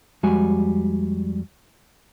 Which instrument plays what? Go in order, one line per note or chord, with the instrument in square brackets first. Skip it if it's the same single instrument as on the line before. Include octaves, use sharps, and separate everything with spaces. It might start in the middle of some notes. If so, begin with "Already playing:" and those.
[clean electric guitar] F2 G3 G#3 F#4 G#5